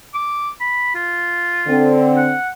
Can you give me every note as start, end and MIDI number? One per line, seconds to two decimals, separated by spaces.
0.14 0.50 86
0.60 0.95 83
0.95 2.00 65
1.67 2.32 50
1.67 2.32 60
2.17 2.49 78